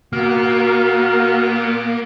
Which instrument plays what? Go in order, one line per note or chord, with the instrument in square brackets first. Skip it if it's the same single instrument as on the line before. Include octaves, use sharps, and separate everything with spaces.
[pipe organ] A#2 B3 [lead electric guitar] A#3 [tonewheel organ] F#4 A#4 F5